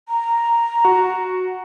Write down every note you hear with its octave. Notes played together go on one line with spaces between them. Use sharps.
A#5
F#4